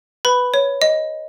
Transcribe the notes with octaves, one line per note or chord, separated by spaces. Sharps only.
B4 B5
C#5
D#5